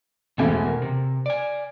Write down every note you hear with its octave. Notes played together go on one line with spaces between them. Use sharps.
G#1 E2 B2 A3 G#5
A#4
C3
D5 G#5